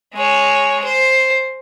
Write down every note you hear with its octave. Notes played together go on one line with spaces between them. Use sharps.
G#3 C#5
C5